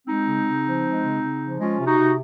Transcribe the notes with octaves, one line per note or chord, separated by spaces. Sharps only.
G#3 C4 D#4
C#3
C#3
F3
G#3
C#3
C#3
F3
G#3 C#4 F4
C3
D#4 F#4
C3